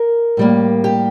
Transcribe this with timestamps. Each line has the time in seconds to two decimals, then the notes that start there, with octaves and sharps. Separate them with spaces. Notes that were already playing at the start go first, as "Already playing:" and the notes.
Already playing: A#4
0.37 A2 G3 A#3
0.84 G4